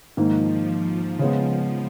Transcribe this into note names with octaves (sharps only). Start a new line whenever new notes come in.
G#2 D#3 F3 A#3
C#3 G#3 B3